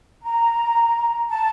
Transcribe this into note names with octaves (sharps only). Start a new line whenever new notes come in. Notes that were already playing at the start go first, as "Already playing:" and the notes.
A#5
A5